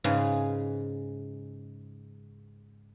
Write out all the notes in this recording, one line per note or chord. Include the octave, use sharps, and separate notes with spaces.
G#2 C#3 G#4 B4